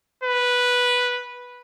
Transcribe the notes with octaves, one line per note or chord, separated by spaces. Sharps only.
B4